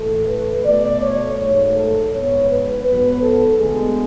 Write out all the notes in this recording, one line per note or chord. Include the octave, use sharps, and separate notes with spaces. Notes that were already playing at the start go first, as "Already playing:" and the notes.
Already playing: A2 E3 A3 A4
B4
B2 A3 D5
C#5
G#2 F#3 A3 C#5
A4
G#2 G#3 B3 C#5
B4
G#2 F#3 B3 B4
A4
D2 D3 G#3 B3 G#4